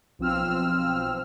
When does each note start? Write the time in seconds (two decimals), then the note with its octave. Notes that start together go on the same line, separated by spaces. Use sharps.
0.19 B1 F3 C4 E6 F6